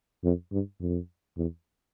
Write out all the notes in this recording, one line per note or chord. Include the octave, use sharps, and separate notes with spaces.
F2
G2
F2
E2